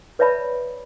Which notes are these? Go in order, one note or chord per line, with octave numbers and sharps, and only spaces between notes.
B4 C#5 D5 E5 A5 B5